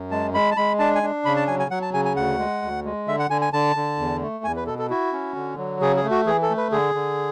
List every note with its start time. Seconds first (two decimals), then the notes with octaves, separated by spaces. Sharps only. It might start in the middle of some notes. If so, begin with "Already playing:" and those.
Already playing: F#2
0.11 G#3 A5
0.34 G#3 B5
0.51 A5
0.57 G#3 B5
0.79 D4 A5
0.95 G#5
1.03 D4
1.25 C#3 B5
1.36 A5
1.47 F#3 G#5
1.59 G#5
1.71 F#3 F#5
1.82 A5
1.94 C#3 G#5
2.05 G#5
2.16 D2 F#5
2.39 G#3
2.62 D2
2.85 G#3
3.08 D3 E5
3.19 F#5
3.30 D3 G#5
3.41 G#5
3.53 D3 A5
3.76 D3
3.99 E2
4.21 A3
4.44 E2 G#5
4.56 B4
4.67 B2 A4
4.79 A4
4.90 E4 F#4
5.12 C#4
5.36 D3
5.58 F#3
5.81 C#3 G#4
5.96 G#4
6.04 A3
6.11 F#4
6.26 E3 G#4
6.42 A4
6.50 A3
6.57 B4
6.72 D3 G#4
6.95 D3